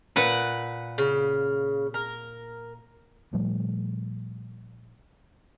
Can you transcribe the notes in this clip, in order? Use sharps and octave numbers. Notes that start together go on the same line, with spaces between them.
A#2 B4 F#5
C#3
A#4
A#2 F3 G3 A3